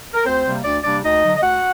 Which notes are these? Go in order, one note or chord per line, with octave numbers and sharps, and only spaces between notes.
A#4
D2 C4 C5
C3 G3 A#3
D2 D4 D5
C3 G3 A#3 D4 D5
D2 D#4 D#5
D3 F#3
D#5
D2 F#4 F#5